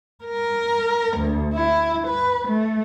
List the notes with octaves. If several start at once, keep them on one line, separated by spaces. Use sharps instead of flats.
A#4
D2
E4
B4
A3